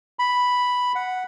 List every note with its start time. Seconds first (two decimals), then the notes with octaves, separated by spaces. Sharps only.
0.19 B5
0.95 F#5